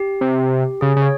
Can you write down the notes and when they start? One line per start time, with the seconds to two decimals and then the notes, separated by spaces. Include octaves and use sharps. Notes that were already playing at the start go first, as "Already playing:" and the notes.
Already playing: G4
0.21 C3
0.81 C#3 G#4
0.96 C#3
1.02 C#5